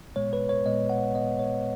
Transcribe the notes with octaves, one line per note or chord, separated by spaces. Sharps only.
A#2 G#3 B3 C#5
B4
C#5
A#2 G#3 B3 D#5
F#5
A#2 G#3 B3 D#5
C#5